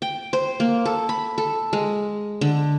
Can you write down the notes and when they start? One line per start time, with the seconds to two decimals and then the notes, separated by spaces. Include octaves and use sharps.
0.02 G5
0.33 C5
0.60 A#3
0.86 A4
1.09 B5
1.38 A4
1.73 G#3
2.41 D3